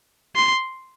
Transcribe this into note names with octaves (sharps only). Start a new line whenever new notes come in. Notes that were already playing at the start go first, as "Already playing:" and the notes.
C6